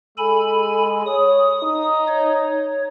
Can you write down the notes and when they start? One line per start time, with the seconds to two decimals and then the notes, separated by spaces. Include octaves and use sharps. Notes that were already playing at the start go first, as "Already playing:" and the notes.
0.18 G#3 A4 G#5 B5
1.07 C#5 D#6
1.63 D#4
2.08 C#5